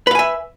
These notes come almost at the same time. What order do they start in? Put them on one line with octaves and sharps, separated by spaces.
B4 F5 G#5 E5